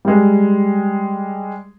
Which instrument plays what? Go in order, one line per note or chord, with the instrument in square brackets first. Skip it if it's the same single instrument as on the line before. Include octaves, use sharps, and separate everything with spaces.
[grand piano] G3 G#3